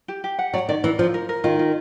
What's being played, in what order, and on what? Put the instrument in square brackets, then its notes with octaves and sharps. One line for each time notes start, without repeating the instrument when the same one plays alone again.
[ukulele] G4
G4
F#5
[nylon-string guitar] F#3 [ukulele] D5
[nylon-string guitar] D#3 [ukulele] D5
[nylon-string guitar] E3 [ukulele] A#4
[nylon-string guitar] F3 [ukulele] F4
[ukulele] A#4
A#4
[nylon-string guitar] D#3 [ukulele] F4
[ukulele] F4